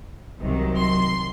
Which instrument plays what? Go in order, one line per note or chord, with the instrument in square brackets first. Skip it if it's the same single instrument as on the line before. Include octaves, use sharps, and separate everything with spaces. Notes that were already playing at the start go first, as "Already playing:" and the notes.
[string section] C2 C3 D#3 F#3
C6